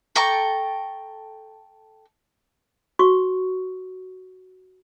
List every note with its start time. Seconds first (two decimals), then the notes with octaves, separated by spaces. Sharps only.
0.16 A4 G5 A#5 C#6
2.99 F#4 C#6